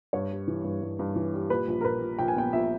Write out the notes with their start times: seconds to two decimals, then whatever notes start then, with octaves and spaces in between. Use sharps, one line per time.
0.13 G2 C#5
0.31 G3
0.48 E3
0.64 G2
0.82 G2
0.99 G2
1.16 E3
1.34 G3
1.50 A#2 B4
1.68 A#1
1.81 A#4
1.85 A#2 B4
2.01 A#2
2.18 A#1 G5
2.28 G#5
2.35 B3 G5
2.53 A#1 E5